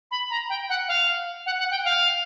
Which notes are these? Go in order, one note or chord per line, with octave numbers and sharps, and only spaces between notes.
B5
A#5
G5
F#5
F5
F#5
F#5
G5
F5